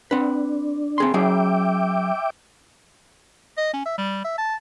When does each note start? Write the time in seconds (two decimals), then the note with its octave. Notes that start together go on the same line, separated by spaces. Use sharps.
0.11 C4 D4 B4
0.98 C4 G#4 C6
1.14 F#3 C#4 G#4 E5 G5 D6
3.57 D#5
3.73 C#4
3.86 E5
3.98 G3
4.25 E5
4.38 A5